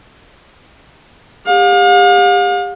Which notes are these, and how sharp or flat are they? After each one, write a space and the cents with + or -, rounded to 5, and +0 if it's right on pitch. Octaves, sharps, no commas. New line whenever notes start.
G4 +35 F5 +40